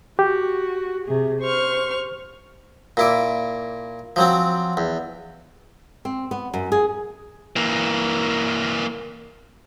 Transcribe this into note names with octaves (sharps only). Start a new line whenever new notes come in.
F#4 G4
C3 G#4
C5 C#6 F6
A#2 E4 D6
F3 F#3 C4
E2
C4
B3
F#2
G#4
E3 A#3